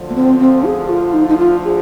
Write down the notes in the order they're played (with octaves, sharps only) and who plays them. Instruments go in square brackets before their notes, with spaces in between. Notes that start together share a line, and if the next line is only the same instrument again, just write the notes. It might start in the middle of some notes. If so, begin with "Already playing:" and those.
Already playing: [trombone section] D2 D3 F3
[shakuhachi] A#3
C4
C4
G#4
F4
D#4
D#4
F4
G#4